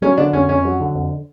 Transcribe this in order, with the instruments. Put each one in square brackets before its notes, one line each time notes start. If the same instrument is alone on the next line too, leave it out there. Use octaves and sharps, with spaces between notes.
[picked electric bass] F#3 [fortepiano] C#4
[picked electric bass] D3 [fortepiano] D4
[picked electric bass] F2 [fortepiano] C#4
[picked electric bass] F2 [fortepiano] C#4
[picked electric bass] F#3
D3
F2